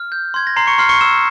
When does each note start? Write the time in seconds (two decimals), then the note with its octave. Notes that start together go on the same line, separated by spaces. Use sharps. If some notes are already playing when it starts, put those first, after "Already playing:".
Already playing: F6
0.12 G6
0.34 C6 G#6
0.47 A#6
0.56 A#5 C6 C7
0.67 C#6 C#7
0.78 C6 F6 C7
0.89 C#6 C#7
1.01 E6 E7